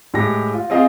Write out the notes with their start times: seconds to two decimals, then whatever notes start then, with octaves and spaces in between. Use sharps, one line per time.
0.14 A2 G#3 G4 A#6
0.54 F4
0.70 C4 F4 G#4 D#5 F5